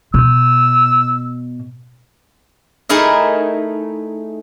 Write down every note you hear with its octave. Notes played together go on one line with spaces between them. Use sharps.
B2 E6
A3 D#4 E4 G#4 A#4 E5